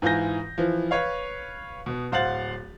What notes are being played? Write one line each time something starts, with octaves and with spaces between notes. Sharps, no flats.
G#2 E3 F4 G#5 G6 A#6
E3 F3
B4 C#5 F5
B2 B3
D1 C5 F5 F#5 A6 F#7